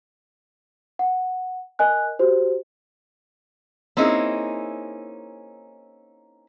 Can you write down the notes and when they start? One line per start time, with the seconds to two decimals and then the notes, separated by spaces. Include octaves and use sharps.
0.99 F#5
1.79 A#4 D#5 G#5 F#6
2.19 F#4 G4 C5
3.97 A#3 C4 C#4 D#4 E4 G#4